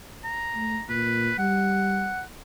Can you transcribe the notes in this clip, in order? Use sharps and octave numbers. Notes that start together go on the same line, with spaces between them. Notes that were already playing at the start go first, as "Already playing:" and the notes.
A#5
A3
A#2 B4
G3 F#5